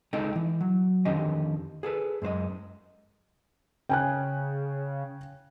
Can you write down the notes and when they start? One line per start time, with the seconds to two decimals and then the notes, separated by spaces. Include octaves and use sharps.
0.13 C#2 G#3 D#4 A4 D#5 G5
0.36 E3
0.61 F#3
1.05 F2 D3 D#3 C#4 G4 D#5
1.83 G#4 A4 B4
2.22 F#2 G#3 C5 D#5
3.89 C#3 G5 G#5 F#6